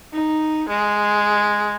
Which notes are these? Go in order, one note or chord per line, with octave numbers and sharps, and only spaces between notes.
D#4
G#3